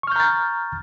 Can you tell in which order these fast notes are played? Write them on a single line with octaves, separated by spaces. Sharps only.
C#6 F6 G6 A#5 A6